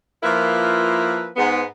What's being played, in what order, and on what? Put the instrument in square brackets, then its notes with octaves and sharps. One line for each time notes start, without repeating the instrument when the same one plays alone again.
[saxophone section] F3 A#3 E4 F4 A#4 B4
G#2 B3